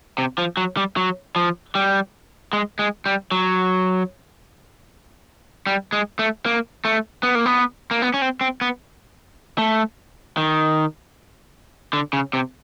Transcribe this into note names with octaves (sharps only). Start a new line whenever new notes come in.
C3
F3
F#3
G3
F#3
F3
G3
G#3
G#3
G3
F#3
G3
G#3
A3
A#3
A3
B3
A#3
B3
A#3
B3
C#4
C4
C4
B3
A3
D#3
D3
C#3
C3